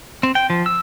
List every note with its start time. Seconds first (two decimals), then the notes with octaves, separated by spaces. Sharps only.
0.23 C4
0.35 G5
0.50 F3
0.66 E6